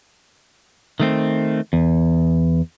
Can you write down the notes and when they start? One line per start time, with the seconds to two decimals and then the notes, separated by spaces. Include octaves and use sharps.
1.00 D#3 A3 C4
1.73 E2